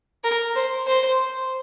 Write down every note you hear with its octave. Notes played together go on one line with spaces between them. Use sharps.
A#4
C5
C5